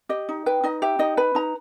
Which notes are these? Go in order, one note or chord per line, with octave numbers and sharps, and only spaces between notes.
G4 D#5
D#4
B4 G5
D#4 D#5
G4 E5
D#4 D#5
B4 B5
D#4 A#5